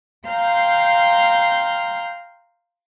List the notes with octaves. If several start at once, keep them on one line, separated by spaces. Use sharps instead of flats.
F5 G5 A#5 C6 F6 G6